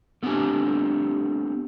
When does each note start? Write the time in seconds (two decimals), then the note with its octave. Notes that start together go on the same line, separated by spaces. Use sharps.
0.23 A3 B3 C4 D4 G4 G#5